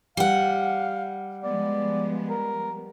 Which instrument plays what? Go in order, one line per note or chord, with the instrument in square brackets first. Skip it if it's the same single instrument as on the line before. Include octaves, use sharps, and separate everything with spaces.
[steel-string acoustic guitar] G3 F#5 [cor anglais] F5
[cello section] F3 G#3 B3 [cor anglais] D5
[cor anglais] A#4